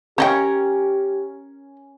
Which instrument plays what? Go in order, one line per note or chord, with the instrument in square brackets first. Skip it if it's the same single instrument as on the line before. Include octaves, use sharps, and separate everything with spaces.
[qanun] C#4 A#4 [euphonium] G4 [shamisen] C5 D#5 G5